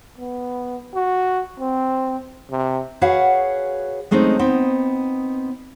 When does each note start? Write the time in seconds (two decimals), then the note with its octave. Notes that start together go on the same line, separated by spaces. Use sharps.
0.18 B3
0.95 F#4
1.59 C4
2.51 C3
3.01 F#4 G#4 B4 C#5 F5 F#5
4.11 G#3 A3 C4 C#4 D#4
4.39 B3 C4 D#4